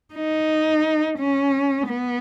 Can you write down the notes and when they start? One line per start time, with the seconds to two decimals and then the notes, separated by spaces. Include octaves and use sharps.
0.14 D#4
1.19 C#4
1.88 B3